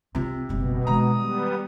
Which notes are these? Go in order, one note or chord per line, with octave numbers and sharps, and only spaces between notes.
C3 C4 F4
F#1 B2 G3
D#3 G#3 A#5 D#6
G3 B3